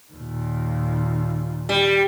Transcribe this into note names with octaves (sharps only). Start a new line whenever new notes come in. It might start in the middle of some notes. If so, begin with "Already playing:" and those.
D#2 A#2
G3